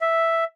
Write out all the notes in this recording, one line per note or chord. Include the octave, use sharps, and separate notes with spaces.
E5